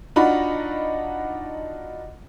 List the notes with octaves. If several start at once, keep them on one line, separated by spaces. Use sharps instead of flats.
D4 D#4 F4 F#4 B5